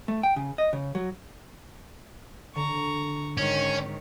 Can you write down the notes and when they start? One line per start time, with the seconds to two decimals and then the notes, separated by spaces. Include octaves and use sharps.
0.08 A3
0.23 G5
0.36 C#3
0.58 D#5
0.73 C#3
0.95 F#3
2.55 D3 A#5 C#6
3.38 G#2 D#3 C#4 C#5